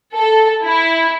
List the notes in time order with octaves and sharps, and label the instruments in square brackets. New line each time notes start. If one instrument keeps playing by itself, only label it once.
[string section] A4
E4